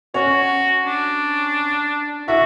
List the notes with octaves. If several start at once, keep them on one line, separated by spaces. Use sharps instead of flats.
C#4 F#4 C#5
D4
E4 F#4 E5